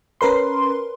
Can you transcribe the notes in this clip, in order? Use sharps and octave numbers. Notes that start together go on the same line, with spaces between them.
C#4 A#4 B4 C6